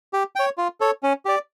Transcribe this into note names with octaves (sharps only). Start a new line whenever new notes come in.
G4
C#5 G5
F4
A4 C#5
C#4
G4 D5